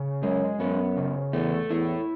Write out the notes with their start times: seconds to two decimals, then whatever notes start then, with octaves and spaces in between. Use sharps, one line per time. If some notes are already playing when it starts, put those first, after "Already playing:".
Already playing: C#3
0.22 F#2 G#3
0.59 F#2 B3
0.97 C#3
1.33 E2 A3
1.69 E2 E4